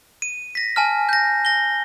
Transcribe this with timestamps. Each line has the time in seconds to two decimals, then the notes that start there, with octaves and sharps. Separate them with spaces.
0.22 D#7
0.55 A#6 B6
0.76 G#5 A5 F6
1.09 G6 A#6
1.45 A#6 G7